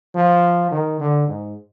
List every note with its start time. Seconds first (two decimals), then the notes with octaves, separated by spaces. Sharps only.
0.15 F3
0.71 D#3
1.00 D3
1.28 G#2